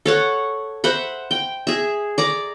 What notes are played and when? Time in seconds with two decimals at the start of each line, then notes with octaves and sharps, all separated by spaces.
0.06 A4 C#5 F#5
0.84 C5 E5 F#5 B5
1.31 G5
1.67 G#4 E5
2.18 D5 A#5 D6